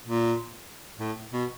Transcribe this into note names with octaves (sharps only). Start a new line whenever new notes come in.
A#2
A2
B2